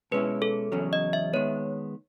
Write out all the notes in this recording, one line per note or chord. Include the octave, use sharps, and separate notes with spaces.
B2 G#3 C#4 E4 B4
A4
E2 C#3 F#3 C#4
D#5
E5
D#3 G#3 B3 C#5